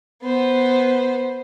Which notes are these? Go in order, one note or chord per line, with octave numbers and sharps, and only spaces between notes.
B3 C5